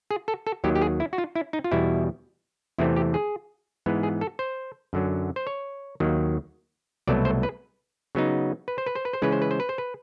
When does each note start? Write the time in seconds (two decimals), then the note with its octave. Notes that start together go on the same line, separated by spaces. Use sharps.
0.11 G#4
0.28 A4
0.47 A4
0.64 D#2 D#3 F#3 G4
0.75 G4
0.82 G#4
1.00 E4
1.13 F#4
1.18 F4
1.36 E4
1.53 D#4
1.64 F4
1.71 E2 B2 G3 E4
2.78 E2 C3 E3 A3 C4 E4
2.96 G4
3.14 G#4
3.86 G#2 E3 G#3 B3
4.03 G#4
4.21 A4
4.39 C5
4.93 F#2 D3 F#3
5.36 C5
5.47 C#5
6.00 D#2 D#3 F#3
7.07 C2 B2 F#3 A3 D5
7.25 C5
7.43 B4
8.15 C#3 F#3 B3 D#4
8.68 B4
8.78 C5
8.86 B4
8.95 C5
9.05 B4
9.13 C5
9.22 C#3 E3 G#3 C#4 B4
9.32 C5
9.42 B4
9.51 C5
9.60 B4
9.69 C5
9.78 B4